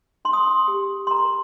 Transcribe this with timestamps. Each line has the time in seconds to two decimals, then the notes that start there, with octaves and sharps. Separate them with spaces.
0.25 D#4 C6
0.33 D#6
0.43 C6
0.68 G4
1.07 C6
1.11 A#4 A#5